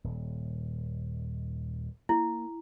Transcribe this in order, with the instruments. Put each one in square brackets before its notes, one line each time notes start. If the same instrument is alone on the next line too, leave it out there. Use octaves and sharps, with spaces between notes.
[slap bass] D#1
[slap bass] A#3 [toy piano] E4